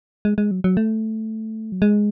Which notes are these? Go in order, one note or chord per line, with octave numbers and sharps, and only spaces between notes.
G#3
G#3
F#3
F#3
A3
F#3
G#3